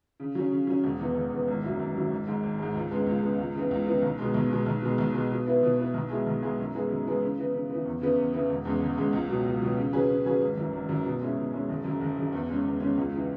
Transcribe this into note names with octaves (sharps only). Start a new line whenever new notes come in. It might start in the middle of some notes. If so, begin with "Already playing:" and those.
C#3
F#3 C#4
C#3
F#3 C#4
E1
E2 E3 B3
E1
E2 E3 B3
G#1
F#2 F#3 E4
G#1
F#2 F#3 E4
G#1
G#2 G#3
G#1
G#2 G#3
C#2
C#3 G#3 B3
C#2
C#3 G#3 B3
C#2
C#3 E3 B3
C#2
C#3 E3 B3
B1
B2 G#3
B1
B2 G#3
B1
B2 G#3
B1
B2 G#3
B2
B3 E4 B4
B2
B3 E4 B4
B1
B2 G#3 E4 G#4
B1
B2 G#3 E4 G#4
F#2
E3 G#3 B3 G#4
F#2
E3 G#3 B3 G#4
C#3
E3 B3
C#3
E3 B3
E2
C#3 E3 B3 E4
E2
C#3 E3 B3 E4
E1
E2 C#3 G#3
E1
E2 C#3 G#3
C#2
B2 F#3
C#2
B2 F#3
C#3
F#3 C#4 G#4 B4
C#3
F#3 C#4 G#4 B4
G#1
F#2 E3
G#1
F#2 E3
B2
G#3 C#4 E4
B2
G#3 C#4 E4
F#1
F#2 C#3
F#1
F#2 C#3
E2
C#3 G#3 C#4
E2
C#3 G#3 C#4
C#2
C#3 E3